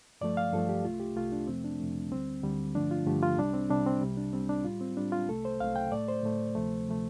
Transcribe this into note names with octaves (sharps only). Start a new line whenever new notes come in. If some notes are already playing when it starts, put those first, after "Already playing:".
G2 F3 A3 D5
F5
G2 F3 A3 A4
G4
C2 C3 A3 F4
G4
C2 C3 A3 F4
D4
F2 C3 F3 A3 C4
D4
F2 C3 F3 A3
D2 D3 G3 C4
D2 D3 G3
G2 D3 F3 A3 D4
F4
G2 D3 F3 A3 G4
F4
C2 C3 G3 D4
C4
C2 C3 G3 D4
C4
C2 C3 G3
D4
C2 C3 G3 C4
D4
A2 G3 F4
C4
A2 G3 D4
F4
C2 C3 A3 A4
C5
C2 C3 A3 F5
G5
A2 A3 D5
C5
A2 A3
D2 C3 F3 A3
C3 F3 A3